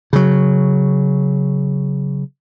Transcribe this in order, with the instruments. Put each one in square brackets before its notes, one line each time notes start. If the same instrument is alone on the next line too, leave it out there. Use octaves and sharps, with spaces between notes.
[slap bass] C#3 F#3